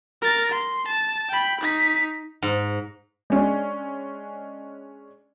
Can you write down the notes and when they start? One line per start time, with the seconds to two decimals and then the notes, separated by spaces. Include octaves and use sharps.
0.22 A#4 A6
0.52 C6
0.88 A5
1.30 G5 B5
1.61 D#4 B6
2.42 G#2
3.30 G#3 C#4 D4